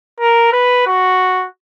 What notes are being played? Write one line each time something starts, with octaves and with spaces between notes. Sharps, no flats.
A#4
B4
F#4